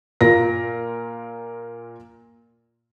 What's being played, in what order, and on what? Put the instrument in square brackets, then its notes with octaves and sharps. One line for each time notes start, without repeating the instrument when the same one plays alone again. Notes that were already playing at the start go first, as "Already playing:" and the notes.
[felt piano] A#2 F4 A#4 A#6